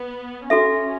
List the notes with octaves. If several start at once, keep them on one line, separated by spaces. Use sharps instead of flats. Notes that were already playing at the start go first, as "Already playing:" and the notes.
Already playing: B3
C#4 F#4 A4 E5